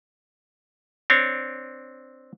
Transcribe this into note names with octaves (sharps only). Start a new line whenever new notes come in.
C4 D4 C#5